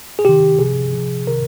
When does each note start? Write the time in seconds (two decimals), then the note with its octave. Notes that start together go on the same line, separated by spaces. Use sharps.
0.19 G#4
0.25 C3 D#3 G4
0.59 C3 F3 G#4
0.93 C3 F3
1.27 C3 D#3 A#4